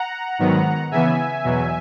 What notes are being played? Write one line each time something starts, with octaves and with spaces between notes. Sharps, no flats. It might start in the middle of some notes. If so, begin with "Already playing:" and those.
Already playing: F#5 A#5
G#2 D#3 F#3 B3
C#3 E3 B3 E5 G#5
E2 B2 F#3